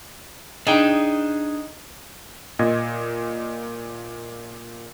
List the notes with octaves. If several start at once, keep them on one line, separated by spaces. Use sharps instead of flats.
D4 D#4 G#4 G5
A#2 D#5 G#6